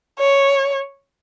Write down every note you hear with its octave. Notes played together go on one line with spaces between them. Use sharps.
C#5